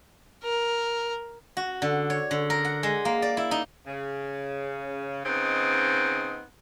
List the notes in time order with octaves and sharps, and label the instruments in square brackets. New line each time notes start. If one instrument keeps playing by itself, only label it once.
[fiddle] A#4
[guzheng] F#4
D3
C#5
D3
A#4
F#5
G#3
A#3
D5
E4
D#4
[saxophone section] C#3
C#3 B3 C4 D#4